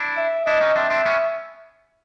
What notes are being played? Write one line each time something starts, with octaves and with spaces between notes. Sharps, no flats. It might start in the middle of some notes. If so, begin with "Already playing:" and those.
Already playing: D4 E4
E5
D4 E4 D#5
C#4 D#4
C4 D4 E5
C4 D4
B3 C#4